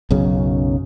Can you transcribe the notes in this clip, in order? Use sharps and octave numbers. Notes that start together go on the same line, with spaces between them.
B1 F#2 C#3